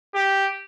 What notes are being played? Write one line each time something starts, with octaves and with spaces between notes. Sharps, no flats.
G4